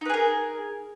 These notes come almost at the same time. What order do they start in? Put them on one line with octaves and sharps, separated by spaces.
D#4 B4 G#4 A#4